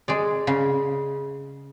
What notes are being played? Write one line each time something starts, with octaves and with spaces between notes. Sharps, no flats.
G#3 G#4 D5
C#3